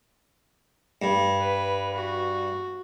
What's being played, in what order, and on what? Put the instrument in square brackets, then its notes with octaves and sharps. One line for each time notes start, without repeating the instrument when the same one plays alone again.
[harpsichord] G2
[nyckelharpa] B4
F#4